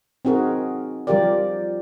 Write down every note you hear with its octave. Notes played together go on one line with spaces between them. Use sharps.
C4 D#4 F#4 G#4 A#4
F3 G3 F4 G4 A#4 D5